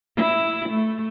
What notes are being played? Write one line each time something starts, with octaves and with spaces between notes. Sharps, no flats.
E4
A3